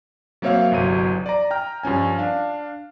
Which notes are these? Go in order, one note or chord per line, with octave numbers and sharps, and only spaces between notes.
F#3 A#3 C4 C#5 E5 F5
G1 C2 F#3 D#7
D5 A#5
G5 A#5 F6
G2 F3 C#4 G#5
D4 F5